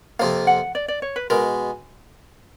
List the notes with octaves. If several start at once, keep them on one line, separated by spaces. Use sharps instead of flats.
F2 C3 F3 A#3 F5
F#5
D5
D5
C#5
B4
B2 G#3 A#4